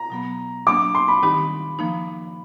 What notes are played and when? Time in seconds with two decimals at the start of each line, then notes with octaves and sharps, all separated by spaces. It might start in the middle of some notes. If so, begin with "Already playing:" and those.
Already playing: A#5
0.10 B2 F#3 B3
0.67 F#3 A#3 D4 D6
0.95 C6
1.08 B5
1.23 D#3 G3 C4 D#4 G4 B5
1.79 F3 A#3 D#4